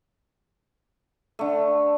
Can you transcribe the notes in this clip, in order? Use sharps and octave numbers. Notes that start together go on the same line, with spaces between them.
D3 A3